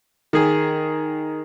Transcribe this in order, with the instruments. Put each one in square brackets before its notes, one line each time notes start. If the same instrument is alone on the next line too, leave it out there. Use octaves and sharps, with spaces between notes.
[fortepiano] D#3 G#4